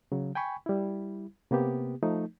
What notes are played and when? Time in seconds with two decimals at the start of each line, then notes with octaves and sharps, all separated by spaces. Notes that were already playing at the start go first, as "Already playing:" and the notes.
0.12 C#3 F#3
0.35 G5 G#5 B5 C#6
0.66 G3 E4
1.51 C3 A#3 B3 G4
2.03 F3 A3 D#4